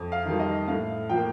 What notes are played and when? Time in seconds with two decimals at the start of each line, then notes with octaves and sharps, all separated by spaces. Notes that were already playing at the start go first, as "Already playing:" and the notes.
Already playing: F2
0.12 F5
0.26 D#3 G3
0.39 D#5
0.67 A2 F5
1.10 F3 A#3 G5